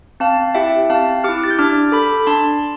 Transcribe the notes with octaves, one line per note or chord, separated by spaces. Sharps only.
C4 F5 A5
E4 G4 E5 G5
C4 F5 A5
E4 G4 D6 F6
A6
G6
D4 D6 F6
A4 B5 D6
D4 A5 C6